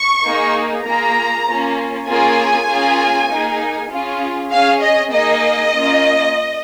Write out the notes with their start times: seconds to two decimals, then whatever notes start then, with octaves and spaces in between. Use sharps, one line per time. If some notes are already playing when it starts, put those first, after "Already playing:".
Already playing: C#6
0.24 A#3 D#4 G#4
0.85 A#3 F4 G#4 A#5
1.46 A#3 C#4 F4
2.06 A#3 C#4 F4 G#4 G#5
2.68 A#3 C#4 F4 G#4
3.29 A#3 D#4 G#4
3.90 C#4 F4 G#4
4.51 C#4 G#4 F5
4.81 D#5
5.12 A#3 D#4 G#4 D#5
5.73 A#3 C#4 F4